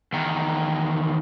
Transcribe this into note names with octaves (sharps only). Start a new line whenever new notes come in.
E2 D#3